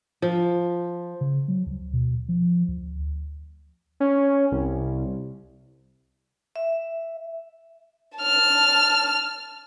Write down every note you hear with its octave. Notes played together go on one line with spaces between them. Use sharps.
F3
C#3
F#3
D2
B2
F3
D2
C#4
C2
E5
A5 F6